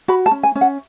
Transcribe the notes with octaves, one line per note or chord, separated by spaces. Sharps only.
F#4 B5
A5
C#4
G#5
C#4
F#5